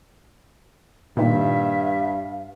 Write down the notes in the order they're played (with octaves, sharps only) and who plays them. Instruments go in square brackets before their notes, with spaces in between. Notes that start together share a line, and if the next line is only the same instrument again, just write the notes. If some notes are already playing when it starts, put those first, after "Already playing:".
[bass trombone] G2 [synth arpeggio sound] A#2 D#3 [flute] E5 [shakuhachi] F5